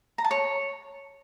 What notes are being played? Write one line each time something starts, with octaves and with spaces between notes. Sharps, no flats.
A#5
A5
C#5